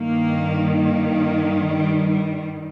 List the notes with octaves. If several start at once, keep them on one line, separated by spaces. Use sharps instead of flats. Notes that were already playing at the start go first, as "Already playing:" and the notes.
Already playing: G2 D#3 A#3
A#3
G3
G3